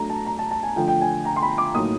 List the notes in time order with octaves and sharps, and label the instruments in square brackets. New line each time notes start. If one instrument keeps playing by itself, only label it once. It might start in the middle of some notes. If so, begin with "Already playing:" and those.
Already playing: [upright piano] F#3 A3 D4 A#5
A5
A#5
A5
A5
G#5
D3 F3 A3 G5
G5
G#5
A#5
C6
B5
D6
A2 F#3 A#3 D#4 D#6